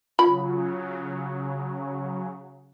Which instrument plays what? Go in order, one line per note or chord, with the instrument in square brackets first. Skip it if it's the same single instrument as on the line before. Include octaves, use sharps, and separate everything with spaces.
[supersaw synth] C#3 F#3 [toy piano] F4 [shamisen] B5